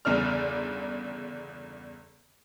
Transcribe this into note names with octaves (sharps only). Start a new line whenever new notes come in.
G1 E2 C#3 D4 D5 F6